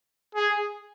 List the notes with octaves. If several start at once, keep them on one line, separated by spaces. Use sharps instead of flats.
G#4